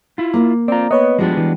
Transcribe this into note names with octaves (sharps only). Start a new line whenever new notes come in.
E4 F4
A#3
C4 F4 D5 A#5
B3 B4 C#5 D#5
F3 G3 G#3 B3 D4 F#4 G4
E3